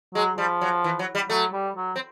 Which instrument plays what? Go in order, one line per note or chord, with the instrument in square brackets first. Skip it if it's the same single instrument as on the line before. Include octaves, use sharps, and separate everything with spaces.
[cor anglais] F#3 [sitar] G#3
[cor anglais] F3 [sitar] G3
[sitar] F#3
E3
F#3
G3
[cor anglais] F#3 [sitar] A3
[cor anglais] G3
F#3
[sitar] C4